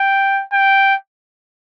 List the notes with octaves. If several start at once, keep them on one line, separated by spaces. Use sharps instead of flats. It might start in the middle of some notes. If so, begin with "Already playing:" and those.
Already playing: G5
G5